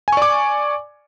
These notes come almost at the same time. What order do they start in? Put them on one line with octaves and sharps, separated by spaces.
G#5 C#6 D5 D6